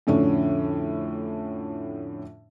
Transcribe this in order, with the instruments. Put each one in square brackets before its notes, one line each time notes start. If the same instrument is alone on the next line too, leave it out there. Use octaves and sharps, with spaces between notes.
[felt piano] F2 A2 D3 C#4